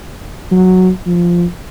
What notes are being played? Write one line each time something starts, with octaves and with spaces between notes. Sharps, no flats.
F#3
F3